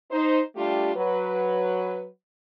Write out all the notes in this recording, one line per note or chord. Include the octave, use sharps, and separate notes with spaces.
D#4 C5
G3 A3 D4 F4 G4
F#3 B4